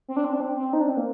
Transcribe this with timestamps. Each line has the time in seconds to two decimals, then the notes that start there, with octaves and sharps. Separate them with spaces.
0.08 C4
0.16 D4
0.24 C4
0.33 D4
0.40 C4
0.56 C4
0.73 D#4
0.81 D4
0.89 C4
0.97 A#3